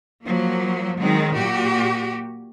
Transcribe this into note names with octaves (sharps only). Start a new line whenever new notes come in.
F3 F#3 A#3
D#3 F#3 G#3 C4
A#2 F#4 G4